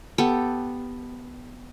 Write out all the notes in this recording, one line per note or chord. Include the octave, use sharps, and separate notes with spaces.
B3 G4 A4